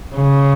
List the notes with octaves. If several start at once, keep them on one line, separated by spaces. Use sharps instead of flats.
C#3